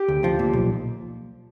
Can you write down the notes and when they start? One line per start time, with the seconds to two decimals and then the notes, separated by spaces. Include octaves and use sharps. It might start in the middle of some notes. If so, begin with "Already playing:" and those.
Already playing: G4
0.08 D2
0.24 F3
0.39 A#2
0.53 B1